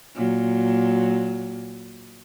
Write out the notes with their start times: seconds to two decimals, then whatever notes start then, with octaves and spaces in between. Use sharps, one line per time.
0.15 A#2 F#3